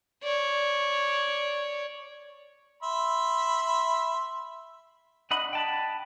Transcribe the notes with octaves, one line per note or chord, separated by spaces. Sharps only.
C#5 D5
E5 B5 C6
D4 D#5 F#5 B5
G5 A5 B5